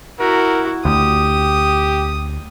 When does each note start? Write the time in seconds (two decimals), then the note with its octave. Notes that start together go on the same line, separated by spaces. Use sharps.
0.19 E4 F#4 A#4
0.85 D2 G4 D#6